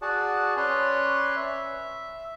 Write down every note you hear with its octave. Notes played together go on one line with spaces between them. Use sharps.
F#4 G#4 D5 F#5 A5
C#4 B4 C#5 D5 C6 F#6
E5